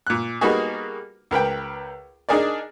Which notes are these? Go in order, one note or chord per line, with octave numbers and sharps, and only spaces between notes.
A#2 F#6
G3 A#3 B3 D#4 F#4 G#4
C#2 A#4 B4 G5
D4 D#4 G#4 A#4 D5